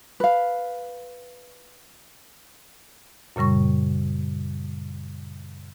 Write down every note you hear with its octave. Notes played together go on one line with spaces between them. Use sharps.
B4 F5
F#2 A#2 C#3 G3 C#6